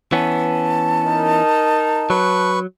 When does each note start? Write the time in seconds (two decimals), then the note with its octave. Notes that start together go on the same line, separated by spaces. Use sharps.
0.12 E3 B3 C#4 A5
1.04 D#4 A#4
2.10 F#3 B4 C#6